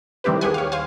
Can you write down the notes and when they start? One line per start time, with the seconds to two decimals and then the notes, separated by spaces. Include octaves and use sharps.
0.24 D#3 G3 C4 E4 G4 B4
0.41 D#2 G4 G#4 F#5 G#5
0.54 C#5 F5
0.72 C5 F5 G#5